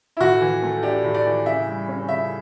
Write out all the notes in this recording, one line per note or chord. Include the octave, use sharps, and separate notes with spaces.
E4
A2 F#4
E3
A3
D4 G4
A2
D5
E3
C#3 E5
G3
C#4
C#3 E5